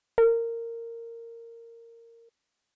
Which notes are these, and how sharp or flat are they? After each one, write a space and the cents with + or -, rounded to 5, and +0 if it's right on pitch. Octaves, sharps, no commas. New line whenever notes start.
A#4 -15